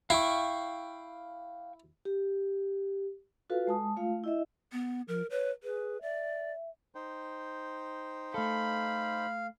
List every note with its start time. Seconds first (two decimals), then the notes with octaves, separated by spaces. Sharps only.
0.10 E4 F5 G5 C#6
2.05 G4
3.50 F4 F#4 A4 B4 F5
3.67 G#3 A5 D#6
3.97 A3 F4 F5
4.24 E4 D#5 E5
4.72 B3
5.08 F3 A#4
5.30 B4 C#5
5.63 G#4 B4
6.02 D5 E5
6.95 D#4 C5 G5
8.34 A3 A4 F5 B5